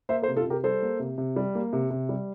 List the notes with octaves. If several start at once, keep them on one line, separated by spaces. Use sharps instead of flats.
A#3 C5 E5
A4 C5
C3
F4 A4
C3
G4 A#4
G3 A4 C5
A#3
C3
C3
G3
A#3
C3
C3
G3